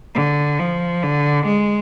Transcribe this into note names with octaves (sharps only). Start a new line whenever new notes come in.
D3
F3
D3
G#3